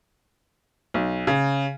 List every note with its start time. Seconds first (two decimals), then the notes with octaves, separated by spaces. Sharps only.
0.94 B1
1.27 C#3